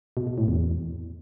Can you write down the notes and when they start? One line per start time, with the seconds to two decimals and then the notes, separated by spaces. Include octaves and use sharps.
0.17 B2
0.27 B2
0.38 A2
0.48 E2